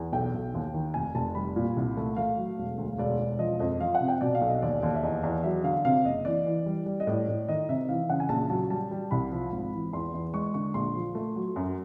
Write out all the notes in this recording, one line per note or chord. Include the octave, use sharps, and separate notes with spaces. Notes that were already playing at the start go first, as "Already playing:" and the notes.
Already playing: E2
B1 G5
B1
D#2
D#3
F1 G#5
F1 A5
G3 B5
A#2
C2
A3
A3 F5
F#3
E1
D2
E1 D5
E1
F3 D#5
F2 D#5
F3 F5
F#5
C3
G5
B2 D5
F5
B1
D#5
D#2 D5
D#2
E5
E2 D#5
E2
F#3 E5
D3 F5
C3 F5
F#1 D#5
E3 D5
E3
G3
G3
D#5
A2 D5
A2
D#3 D#5
C3 E5
E3 F5
C#3 F#5
G#5
A#1 A5
F#3 A5
G3 A5
G3
C2 B5
F3
G#1
E3
E2 C6
E2
G#3 C#6
D3 C#6
A#1 C6
F3
A3
F#3
F#2